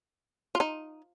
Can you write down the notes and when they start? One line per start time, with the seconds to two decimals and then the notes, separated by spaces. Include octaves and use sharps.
0.55 F4
0.60 D#4